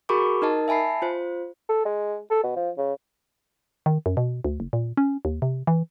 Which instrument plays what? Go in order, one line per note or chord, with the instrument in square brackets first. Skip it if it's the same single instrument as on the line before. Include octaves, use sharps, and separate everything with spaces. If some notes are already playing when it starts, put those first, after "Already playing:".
[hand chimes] F#4 G#4 A#4 B5 C#6 D6
D#4 A#4 D#5 A5
E5 G#5 A5 B5 C7
F4 C5
[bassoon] A4
G#3
A4
B2
F3
C#3
[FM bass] D#3
F#2
B2
D2
F#1
A#2
C#4
D#2
C3
E3